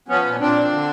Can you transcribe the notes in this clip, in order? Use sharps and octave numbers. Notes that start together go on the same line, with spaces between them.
F3 B3 C#4
A#2
A#2 C4 D4
F3
D3